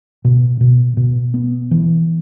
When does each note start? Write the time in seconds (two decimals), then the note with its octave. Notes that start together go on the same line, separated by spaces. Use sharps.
0.25 B2
0.61 B2
0.97 B2
1.34 B3
1.71 E3